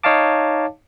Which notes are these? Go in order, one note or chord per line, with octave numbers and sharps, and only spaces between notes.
D#4 C#5 D#5 F5 A5 D6